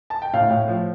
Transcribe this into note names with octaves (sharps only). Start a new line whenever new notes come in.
A5
G5
A2 F5
A2
F3